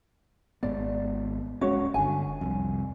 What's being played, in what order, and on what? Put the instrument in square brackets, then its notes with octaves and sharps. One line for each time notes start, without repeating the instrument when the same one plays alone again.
[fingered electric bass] G#1 G#2 B3 [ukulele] D5
[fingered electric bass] D1 G#3 C#4 [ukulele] F#4 C#5
[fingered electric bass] G1 D3 [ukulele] G#5
[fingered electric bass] C2 F2